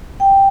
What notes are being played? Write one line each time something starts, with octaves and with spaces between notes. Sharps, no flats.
G5